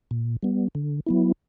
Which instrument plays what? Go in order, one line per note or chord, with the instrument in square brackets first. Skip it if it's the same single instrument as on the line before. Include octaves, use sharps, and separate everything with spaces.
[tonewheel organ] A#2
G3 B3
D3
F#3 B3 E4